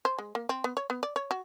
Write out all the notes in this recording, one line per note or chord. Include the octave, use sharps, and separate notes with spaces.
C5
G#3
A#3
C4
B3
C#5
B3
D5
C#5
F#4